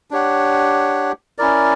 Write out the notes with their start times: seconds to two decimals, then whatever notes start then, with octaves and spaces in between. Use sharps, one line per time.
0.11 D4 G4 C#5 F#5
1.38 C#4 E4 A#4 D5